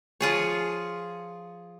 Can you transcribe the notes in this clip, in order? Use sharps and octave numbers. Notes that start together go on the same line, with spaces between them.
F3 F4 G#4 C#5